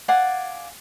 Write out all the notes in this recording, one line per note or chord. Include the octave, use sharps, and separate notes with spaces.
D5 F5 F#5 G#5